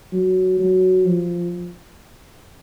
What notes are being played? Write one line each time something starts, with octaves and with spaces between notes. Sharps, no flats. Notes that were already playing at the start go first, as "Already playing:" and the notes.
F#3
F#3
F3